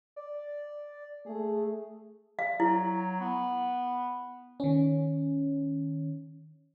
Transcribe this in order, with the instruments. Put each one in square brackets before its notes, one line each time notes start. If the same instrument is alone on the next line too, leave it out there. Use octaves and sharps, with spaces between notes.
[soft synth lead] D5
[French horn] A3 [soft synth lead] G#4
[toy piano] F5
[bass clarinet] F#3 [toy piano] E4
[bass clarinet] B3
[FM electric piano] D#3 C#4